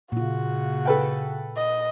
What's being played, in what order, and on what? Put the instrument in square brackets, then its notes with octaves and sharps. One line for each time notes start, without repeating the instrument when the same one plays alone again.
[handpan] A#2 F4 [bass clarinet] C#3 [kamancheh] F#4
[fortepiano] A4 B4 G5
[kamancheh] D#5